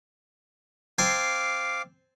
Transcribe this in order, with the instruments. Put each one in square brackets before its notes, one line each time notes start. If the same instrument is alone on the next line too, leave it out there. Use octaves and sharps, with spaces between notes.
[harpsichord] C4 G#5 A5 [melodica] F5 D6